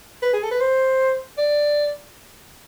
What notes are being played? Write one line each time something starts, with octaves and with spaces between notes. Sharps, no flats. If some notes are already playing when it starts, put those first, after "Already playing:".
B4
G#4
A4
B4
C5
D5